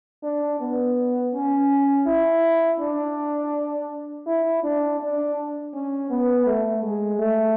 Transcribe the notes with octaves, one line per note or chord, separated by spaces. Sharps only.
D4
B3
C#4
E4
D4
E4
D4
D4
C#4
B3
A3
G#3
A3